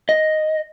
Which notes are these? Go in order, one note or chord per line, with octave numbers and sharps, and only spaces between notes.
D#5